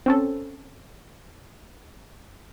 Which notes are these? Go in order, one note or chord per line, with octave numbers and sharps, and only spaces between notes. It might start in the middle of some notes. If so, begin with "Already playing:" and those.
C4 C#4 A4